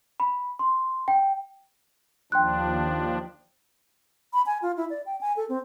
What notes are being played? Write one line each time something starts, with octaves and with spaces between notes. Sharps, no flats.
B5
C6
G5
D#2 F3 D4 G5 C6 F#6
B5
G#5
F4
E4
D5
G5
G#5
A4
C4